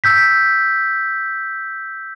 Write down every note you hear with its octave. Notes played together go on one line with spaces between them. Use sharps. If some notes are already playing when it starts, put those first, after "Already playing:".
E6 G6 B6